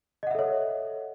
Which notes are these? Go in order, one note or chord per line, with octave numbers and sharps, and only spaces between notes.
A4 C#5 D#5 E5 F#5